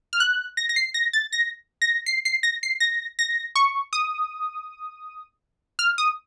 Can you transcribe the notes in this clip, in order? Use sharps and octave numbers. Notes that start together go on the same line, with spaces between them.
F6
F#6
A#6
A#6
C7
A#6
A6
A#6
A#6
C7
C7
A#6
C7
A#6
A#6
C#6
D#6
F6
D#6